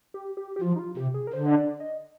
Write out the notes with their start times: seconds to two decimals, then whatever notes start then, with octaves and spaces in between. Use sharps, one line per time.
0.14 G4
0.37 G4
0.56 G4
0.61 F3 F4
0.76 D#4
0.79 F4
0.97 C3 G4
1.14 G#4
1.27 A#4
1.33 D3 C5
1.46 D#5
1.56 D5
1.80 D#5